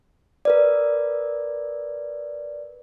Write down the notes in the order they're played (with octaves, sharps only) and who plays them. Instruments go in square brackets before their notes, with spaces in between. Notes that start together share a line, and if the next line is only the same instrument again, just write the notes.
[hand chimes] A#4 B4 D5